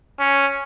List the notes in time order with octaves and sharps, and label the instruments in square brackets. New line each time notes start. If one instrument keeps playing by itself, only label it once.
[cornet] C#4